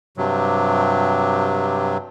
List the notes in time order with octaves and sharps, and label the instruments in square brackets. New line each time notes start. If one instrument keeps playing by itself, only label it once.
[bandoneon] G2 C3 F#3